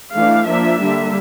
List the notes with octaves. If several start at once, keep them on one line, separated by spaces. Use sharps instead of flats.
E3 A3 D4 F5
F3 A#3 D4 E5
D3 G3 A#3 D4